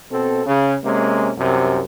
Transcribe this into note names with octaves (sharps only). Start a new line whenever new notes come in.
B2 C4 A4
C#3
C3 G#3 A#3 C#4
C2 F#2 C3